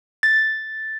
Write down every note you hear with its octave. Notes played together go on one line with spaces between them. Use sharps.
A6